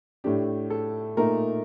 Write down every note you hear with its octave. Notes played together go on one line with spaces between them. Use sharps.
A2 A3 D4 G4
A4
A#2 A3 D#4 A#4